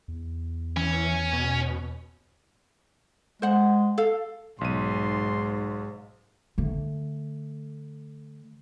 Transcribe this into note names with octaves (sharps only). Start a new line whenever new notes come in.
E2
E3 C#4
B2
G#3 C5 F#5
A4 F5
B1 G#2 C6 D#7
D3 A3